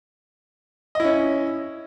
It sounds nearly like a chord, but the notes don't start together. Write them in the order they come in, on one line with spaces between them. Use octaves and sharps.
D#5 E4 C#4